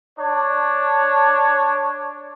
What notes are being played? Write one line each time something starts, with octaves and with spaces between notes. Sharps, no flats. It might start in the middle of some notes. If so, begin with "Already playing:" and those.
D4 C#5